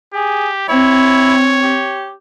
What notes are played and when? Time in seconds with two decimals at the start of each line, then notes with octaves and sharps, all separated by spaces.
0.14 G4 G#4
0.69 C4 E4 C#5
1.63 G4